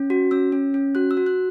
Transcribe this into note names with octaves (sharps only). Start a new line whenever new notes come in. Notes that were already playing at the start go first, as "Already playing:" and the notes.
Already playing: C#4
F#4
C#4 E6
C#4
C#4
F#4 F#6
E6
F#4
F#6